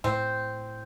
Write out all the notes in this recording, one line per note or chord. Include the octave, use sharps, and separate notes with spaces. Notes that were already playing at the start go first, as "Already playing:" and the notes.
A2 C4